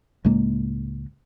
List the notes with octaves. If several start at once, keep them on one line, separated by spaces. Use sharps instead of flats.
C#2 A2 G#3 A#3